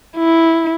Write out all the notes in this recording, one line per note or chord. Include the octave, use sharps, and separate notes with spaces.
E4